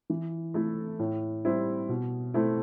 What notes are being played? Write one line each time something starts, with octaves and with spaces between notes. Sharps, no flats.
E3
A3 E4 A4
A2
G3 C4 E4
B2
A3 C4 E4